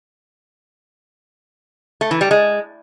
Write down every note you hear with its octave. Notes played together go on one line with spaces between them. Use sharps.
A3
E3
G3
G#3